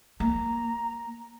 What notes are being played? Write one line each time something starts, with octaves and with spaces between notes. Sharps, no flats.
A#3 A#5